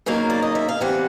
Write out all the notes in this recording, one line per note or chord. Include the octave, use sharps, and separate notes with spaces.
C#3 F#3 A#3 D#4 F5
D5
D#5
E5
F5
E3 G3 C4 F#5